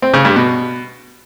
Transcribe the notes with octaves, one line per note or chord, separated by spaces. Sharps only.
C4
C#3
G2
B2